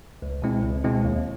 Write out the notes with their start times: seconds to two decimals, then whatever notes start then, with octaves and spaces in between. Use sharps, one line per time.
0.22 C#2
0.42 B2 G#3 C4 E4
0.63 C#2
0.84 B2 G#3 C4 E4
1.04 D#2